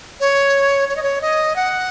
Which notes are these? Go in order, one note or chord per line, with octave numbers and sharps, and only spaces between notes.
C#5
C#5
D#5
C#5
D#5
F#5